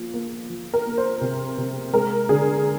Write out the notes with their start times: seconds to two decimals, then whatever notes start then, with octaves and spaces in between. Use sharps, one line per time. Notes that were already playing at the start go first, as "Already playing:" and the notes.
Already playing: F3 A#3
0.14 A#3
0.49 F3
0.74 A#4
0.86 A#3
0.98 C5
1.21 C3
1.58 C3
1.93 G#3 A#4
2.29 D3 G#4